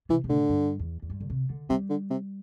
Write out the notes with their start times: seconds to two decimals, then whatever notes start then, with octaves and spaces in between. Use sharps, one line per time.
0.09 C3 E3
0.24 C3
0.29 A2 D3
0.49 G2
0.79 E2
1.02 E2
1.10 G2
1.20 D3
1.30 C3
1.50 D3
1.69 C3 G3
1.89 D3
2.10 C3